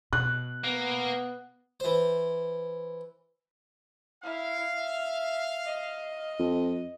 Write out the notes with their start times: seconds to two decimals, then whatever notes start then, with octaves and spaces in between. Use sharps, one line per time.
0.13 B2 F#6
0.64 A#3 B3
1.80 E3 C5
4.23 E4 F5
4.77 E5
5.66 D#5
6.39 F2